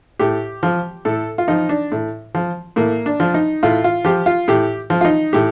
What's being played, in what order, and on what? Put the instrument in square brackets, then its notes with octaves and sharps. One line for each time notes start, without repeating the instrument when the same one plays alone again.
[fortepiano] A2 G4
F3
A2 A4
F4
F3 D#4
D4
A2
F3
A2 A#3
D4
F3
D#4
A2 F4
F4
F3 G4
F4
A2 G4
F3
F4
D#4
A2 G4